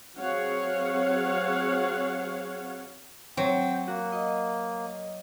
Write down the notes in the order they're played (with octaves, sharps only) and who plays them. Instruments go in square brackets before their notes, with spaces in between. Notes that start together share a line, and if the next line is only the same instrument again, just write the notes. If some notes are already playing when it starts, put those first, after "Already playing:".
[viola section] F#3 C4 G#4 C#5 F5 F#5
[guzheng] F#3 [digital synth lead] C4 [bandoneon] G5
[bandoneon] A#3 [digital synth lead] F#4
[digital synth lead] D#5